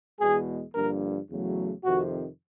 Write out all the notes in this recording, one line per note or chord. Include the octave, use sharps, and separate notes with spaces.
E2 B2 G#3 G#4
G2 D3 F3 A#3 A#4
E2 C#3 F#3 A3
F2 C3 D#3 F#4